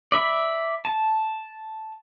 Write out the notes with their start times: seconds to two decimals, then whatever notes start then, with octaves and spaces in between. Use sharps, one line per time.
0.12 D5 E5 B5
0.85 A5